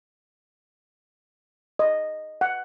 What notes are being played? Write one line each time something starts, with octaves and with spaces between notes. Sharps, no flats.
D#5
F#5